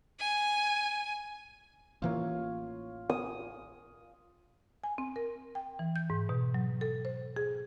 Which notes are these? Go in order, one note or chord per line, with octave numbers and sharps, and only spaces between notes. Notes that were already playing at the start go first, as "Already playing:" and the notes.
G#5
A1 E3 A#3 F4 C#5
D#6
G#5
C4
A#4
G5
E3
G6
G#2
B2
F#3
A4
C5
G#4